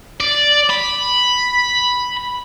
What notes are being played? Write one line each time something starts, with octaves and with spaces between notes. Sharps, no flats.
D5
B5